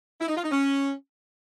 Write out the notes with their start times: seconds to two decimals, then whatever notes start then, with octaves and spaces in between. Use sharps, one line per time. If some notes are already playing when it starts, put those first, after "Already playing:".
0.21 E4
0.28 D#4
0.36 F4
0.44 D#4
0.51 C#4